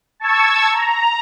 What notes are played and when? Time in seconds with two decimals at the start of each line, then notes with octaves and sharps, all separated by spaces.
0.20 A5 C#6 E6 G#6
0.72 A#5